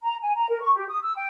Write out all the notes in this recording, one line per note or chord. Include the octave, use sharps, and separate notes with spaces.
A#5
G#5
A#5
A#4
C#6
G4
D#6
E6
G5